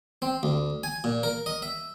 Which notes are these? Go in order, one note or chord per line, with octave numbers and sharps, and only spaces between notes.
C4
D2
G#5
A#2
A#4
D#5
E5